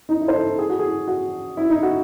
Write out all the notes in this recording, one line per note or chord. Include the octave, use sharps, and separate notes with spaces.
D#4
E4
C5
A4
G#4
F#4
G#4
F#4
E4
D#4
F#4